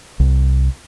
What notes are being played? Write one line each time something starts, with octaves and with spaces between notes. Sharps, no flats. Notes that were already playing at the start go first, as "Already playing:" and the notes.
C2